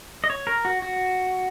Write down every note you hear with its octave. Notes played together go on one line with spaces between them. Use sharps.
D#5
C#5
A#4
F#4
F#4